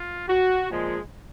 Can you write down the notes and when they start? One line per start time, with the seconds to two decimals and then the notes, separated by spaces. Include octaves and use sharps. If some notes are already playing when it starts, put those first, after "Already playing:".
Already playing: F4
0.28 F#4
0.69 A#2 F3 G#3